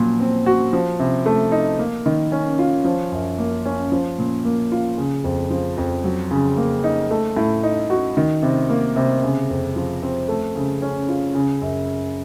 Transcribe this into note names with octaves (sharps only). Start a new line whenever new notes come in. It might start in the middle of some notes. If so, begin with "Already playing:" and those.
Already playing: A#2 F3 F#3
C4
F#4
F3
C3
A3
D#4
A#3
D#3
C#4
F4
F3
F#2
A#3
C#4
F3
A#2
A#3
F4
C#3
F2
F3
F2
F#3
C#3
A#3
D#4
A3
A2
D#4
F#4
D#3
C3
A#3
C3
C#3
F2
F3
C4
A3
C#3
C#4
F4
C#3
F#2